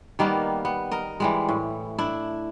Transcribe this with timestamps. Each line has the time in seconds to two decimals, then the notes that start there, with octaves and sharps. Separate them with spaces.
0.19 D#3 G3 A#3 B3
0.65 B3
0.91 A#4 D#5
1.20 E3 G3 G#3
1.49 A2
1.98 D4 E4